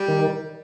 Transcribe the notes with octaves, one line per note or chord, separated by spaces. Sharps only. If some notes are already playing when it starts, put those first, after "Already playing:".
Already playing: G3
D#3